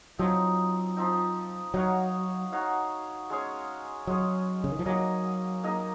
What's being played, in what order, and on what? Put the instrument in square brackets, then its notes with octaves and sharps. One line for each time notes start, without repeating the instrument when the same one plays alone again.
[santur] F3 C4 D#4 [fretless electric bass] F#3
[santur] F3 C4 D#4
[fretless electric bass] F#3 [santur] D#4 F#4 C#5 F5
[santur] D#4 F#4 C#5 F5
G#3 C#4 G#4 C#5
[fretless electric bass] F#3 [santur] G#3 C#4 G#4 C#5
[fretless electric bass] C#3
D#3
F3
[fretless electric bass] F#3 [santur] A#3 D#4 G#4 D#5
[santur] A#3 D#4 G#4 D#5